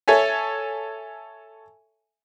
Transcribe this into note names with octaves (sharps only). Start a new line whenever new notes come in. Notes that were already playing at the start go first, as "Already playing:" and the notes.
A4 C#5 E5 G#5